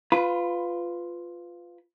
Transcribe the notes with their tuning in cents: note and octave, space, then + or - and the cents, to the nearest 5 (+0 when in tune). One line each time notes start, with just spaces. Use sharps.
F4 +0 B4 +20 B5 +0